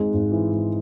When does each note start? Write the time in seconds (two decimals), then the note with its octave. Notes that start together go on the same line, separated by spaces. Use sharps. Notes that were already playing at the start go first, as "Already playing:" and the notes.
Already playing: G#1 G#2 G#3
0.14 G#1
0.32 E3
0.52 G#2